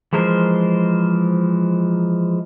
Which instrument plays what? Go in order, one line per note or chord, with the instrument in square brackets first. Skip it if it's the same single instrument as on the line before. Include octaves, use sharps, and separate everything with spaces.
[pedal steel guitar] E3 F3 G#3 A#4 C5